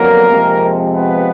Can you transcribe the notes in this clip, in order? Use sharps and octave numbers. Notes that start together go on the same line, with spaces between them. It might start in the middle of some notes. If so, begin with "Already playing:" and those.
Already playing: F2 D3 F#3 A#3 B3 A#4
F2 C3 F3 G#3
B3 B4